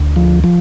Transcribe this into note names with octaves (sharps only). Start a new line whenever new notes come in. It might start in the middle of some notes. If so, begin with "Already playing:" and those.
Already playing: D2
F3
F3